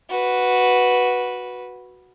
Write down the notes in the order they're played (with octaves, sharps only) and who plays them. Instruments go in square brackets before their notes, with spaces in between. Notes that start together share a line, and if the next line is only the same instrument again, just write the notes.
[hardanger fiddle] F#4 B4